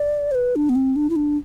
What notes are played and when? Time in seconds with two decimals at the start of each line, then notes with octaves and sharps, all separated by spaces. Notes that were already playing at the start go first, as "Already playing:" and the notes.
Already playing: D5
0.31 C5
0.35 B4
0.56 D4
0.69 B3
0.75 C4
0.96 D4
1.10 E4
1.16 D4